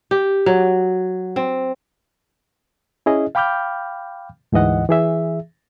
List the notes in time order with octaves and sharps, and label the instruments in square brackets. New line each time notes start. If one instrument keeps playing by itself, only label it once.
[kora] G4
F#3
C4
[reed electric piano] C#4 E4 G#4 D#5
F5 G5 B5 D6 F6 G6
D2 G#2 E3 D#5 F#5
E3 G#4 E5